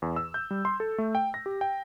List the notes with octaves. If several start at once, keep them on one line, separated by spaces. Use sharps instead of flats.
E2
E6
G6
G3
C6
A4
A3
G5
A#6
G4
G5